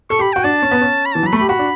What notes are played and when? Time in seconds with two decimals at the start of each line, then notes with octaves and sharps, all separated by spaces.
0.10 A4 C#6
0.19 G4 B5
0.33 F#4 G5
0.44 D4 A5
0.62 C#4
0.71 B3
0.81 C#4
1.06 B5
1.14 E3 A5
1.23 F#3
1.27 B5
1.33 A3
1.38 B5
1.41 G4
1.49 F#4 B5
1.59 D4